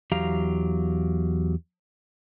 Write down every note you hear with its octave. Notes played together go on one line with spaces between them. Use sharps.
E2 F#3 G4 F5 A#5